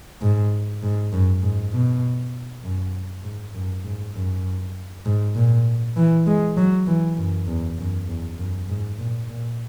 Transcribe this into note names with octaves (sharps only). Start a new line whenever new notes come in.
G#2
G#2
F#2
G#2
B2
F#2
G#2
F#2
G#2
F#2
G#2
A#2
E3
G#3
F#3
E3
F#2
E2
F#2
E2
F#2
G#2
A#2
A#2